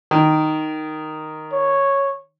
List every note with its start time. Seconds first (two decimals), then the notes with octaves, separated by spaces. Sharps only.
0.11 D#3
1.52 C#5